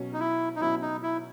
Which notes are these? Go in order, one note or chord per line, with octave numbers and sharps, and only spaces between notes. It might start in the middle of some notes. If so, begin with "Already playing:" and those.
Already playing: B2 F#3 C#4
D#4
E4
D#4
B2 F#3 C#4 E4
D#4
E4